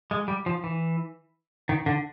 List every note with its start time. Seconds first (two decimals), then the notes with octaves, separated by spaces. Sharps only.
0.11 G#3
0.28 G3
0.46 F3
0.64 E3
1.69 D#3
1.86 D3